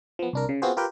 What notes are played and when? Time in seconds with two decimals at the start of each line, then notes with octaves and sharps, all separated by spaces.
0.19 F3 B3
0.33 C2 D4 A#4
0.49 C#3
0.62 B3 C4 F4 F#4 G#4 C5
0.77 F4 G4 A#4 B4 G5